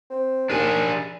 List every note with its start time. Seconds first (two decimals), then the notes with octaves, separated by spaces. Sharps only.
0.10 C4
0.50 D#2 D4 G#4